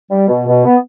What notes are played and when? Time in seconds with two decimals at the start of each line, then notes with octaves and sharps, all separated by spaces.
0.11 G3
0.28 B2
0.47 B2
0.65 B3